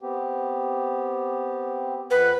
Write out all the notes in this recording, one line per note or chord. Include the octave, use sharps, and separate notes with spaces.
B3 C4 G4
F2 B4 F#5